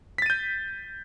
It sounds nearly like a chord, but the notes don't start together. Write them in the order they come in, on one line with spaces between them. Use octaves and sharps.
B6 A6 D#7 G6